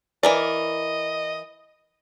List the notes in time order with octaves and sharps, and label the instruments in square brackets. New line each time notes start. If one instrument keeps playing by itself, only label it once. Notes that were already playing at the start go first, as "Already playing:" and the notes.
[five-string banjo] E3 A#4 D5 [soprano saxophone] D#5